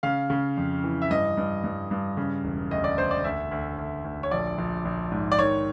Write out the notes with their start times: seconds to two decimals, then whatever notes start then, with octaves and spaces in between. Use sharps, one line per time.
0.03 C#3 F5
0.30 C#3
0.57 F2
0.83 E3
1.02 E5
1.10 G2 D#5
1.37 G2
1.64 G2
1.91 G2
2.17 C#3
2.44 E1
2.71 D2 D#5
2.84 D5
2.97 D2 C5
3.11 D5
3.24 D2 E5
3.51 D2
3.78 D2
4.04 D2
4.23 C#5
4.31 A#1 D5
4.58 A#1
4.85 A#1
5.12 G#2
5.32 D5
5.39 D#3 C#5